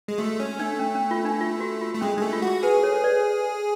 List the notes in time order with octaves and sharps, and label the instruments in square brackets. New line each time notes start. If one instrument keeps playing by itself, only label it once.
[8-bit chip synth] G#3
[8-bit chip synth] A3 [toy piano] F#4
[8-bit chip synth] C#4
[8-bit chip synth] A3 [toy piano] D4
[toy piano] C#4
C#4
F4
D4
F4
F#4
F4
[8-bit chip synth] A3
[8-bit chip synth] G#3 [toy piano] C#4
[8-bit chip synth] G#3 [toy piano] D4
[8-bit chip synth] A3
[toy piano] F4
[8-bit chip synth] F#4 [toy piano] G#4
[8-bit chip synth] G#4 [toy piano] B4
[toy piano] A4 C#5
B4 D5